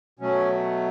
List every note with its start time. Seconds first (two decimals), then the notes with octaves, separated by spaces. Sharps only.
0.19 B2 F#3 A3 C#4